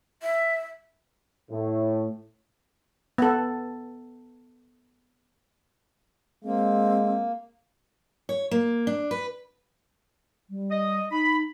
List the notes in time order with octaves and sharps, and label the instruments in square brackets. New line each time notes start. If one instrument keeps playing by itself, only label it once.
[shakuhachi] E5
[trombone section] A2
[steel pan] B3 A4
[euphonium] G#3 [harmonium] A#3 [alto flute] C4
[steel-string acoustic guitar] C#5
A#3
D4
B4
[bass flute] G3
[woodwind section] D#5
[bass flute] D#4 [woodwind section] B5